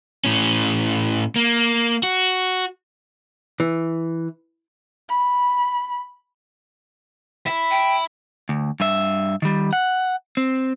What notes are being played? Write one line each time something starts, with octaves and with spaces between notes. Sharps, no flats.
A2 C#4
A#3
F#4
E3
B5
E4
G5
D2
G2 E5
D#3 G3
F#5
C4